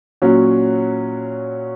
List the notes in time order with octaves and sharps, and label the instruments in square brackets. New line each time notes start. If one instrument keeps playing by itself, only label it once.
[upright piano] A#2 F#3 C#4 F#4